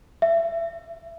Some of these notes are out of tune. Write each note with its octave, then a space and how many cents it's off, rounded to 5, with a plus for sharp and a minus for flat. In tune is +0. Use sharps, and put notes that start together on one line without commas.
E5 +25